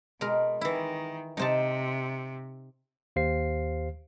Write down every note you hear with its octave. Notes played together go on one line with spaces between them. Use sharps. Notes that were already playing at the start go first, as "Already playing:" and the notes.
B2 G#3 A#4
D#3 E3 E4
C3 D#4 C5 A5
D#2 G4 C5 F5 C7